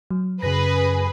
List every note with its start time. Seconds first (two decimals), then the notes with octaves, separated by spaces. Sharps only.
0.11 F#3
0.42 F#2 C#3 G#4 B4 A#6